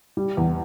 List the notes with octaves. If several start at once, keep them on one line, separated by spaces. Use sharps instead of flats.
G3
E2